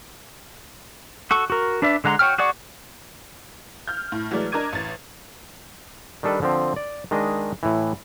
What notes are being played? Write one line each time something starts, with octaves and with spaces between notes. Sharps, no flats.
F#4 A4 C#6
F#4 A#4
D4 B4 D5 E5
D3 G#3 F#5 A#5 C6
F#4 C#5 G5 F6
F#4 G#4 D5 F#5 C#6
F6 G6
A2
E3 F#3 G#3 A3 D5
D4 A#4 D#5 D6 G#6 D#7
A1 A6
D#3 G3 D4 A4 B4
D3 F3 C4
D5
D#3 G#3 D4 D#5
A2 E3